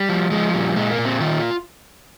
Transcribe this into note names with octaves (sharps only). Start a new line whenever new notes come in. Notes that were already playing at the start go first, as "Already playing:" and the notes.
Already playing: G3
F3
F3 G#3
A#2 G3
A#2 G#3
A#3
A#2
C4
D#3 F4